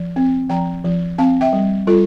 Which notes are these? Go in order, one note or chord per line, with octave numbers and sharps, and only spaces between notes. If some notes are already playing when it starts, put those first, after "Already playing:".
Already playing: F3
C4
F3 G5 A#5
F3
C4 F5 A5
E5 G5
G3
G3 F4 A4